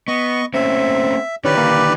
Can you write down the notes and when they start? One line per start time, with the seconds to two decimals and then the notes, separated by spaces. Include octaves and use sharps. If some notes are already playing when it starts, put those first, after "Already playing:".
0.08 B3 D#5 C#6
0.54 A3 A#3 C4 C#4 E5
1.45 D3 D#3 C#4 E4 G4 B4 D5
1.57 A#3